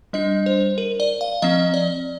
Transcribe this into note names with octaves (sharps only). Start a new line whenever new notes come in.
G3 D4 D#5
C5
A#4
D5
F5
F3 C4 D#5
D5